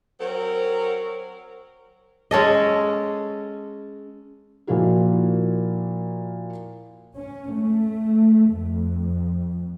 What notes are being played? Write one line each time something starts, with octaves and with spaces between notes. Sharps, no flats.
F#3 C4 A#4
G#3 C#4 A4 D#5
A#2 F3 A#3 E4 F#4 A#4
C#4
A3
F2